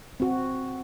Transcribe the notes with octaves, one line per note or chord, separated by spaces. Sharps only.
C4 F#4